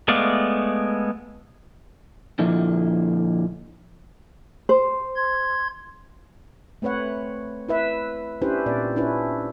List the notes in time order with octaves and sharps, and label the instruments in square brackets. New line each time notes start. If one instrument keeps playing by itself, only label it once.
[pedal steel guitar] G#3 A3 B3 D5 F5
[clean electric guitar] A#2 D3 F3 E4
[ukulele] C5
[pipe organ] C6 G#6
[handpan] A3 C4 B4 C#5 F#5
E4 B4 E5
C#4 D4 E4 G4 B4 C5
A#2 C4 D5
C#4 D4 E4 B4